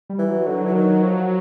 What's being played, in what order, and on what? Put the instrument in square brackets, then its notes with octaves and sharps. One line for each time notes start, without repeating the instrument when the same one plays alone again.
[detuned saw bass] G3
[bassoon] E3
[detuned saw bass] F#3
[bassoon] D3
E3
D#3
F3